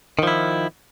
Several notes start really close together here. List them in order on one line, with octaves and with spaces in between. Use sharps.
D#3 F3 E4